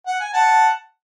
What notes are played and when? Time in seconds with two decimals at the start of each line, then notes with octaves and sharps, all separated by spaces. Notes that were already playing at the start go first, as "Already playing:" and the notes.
0.07 F#5
0.20 G#5
0.33 F#5 A5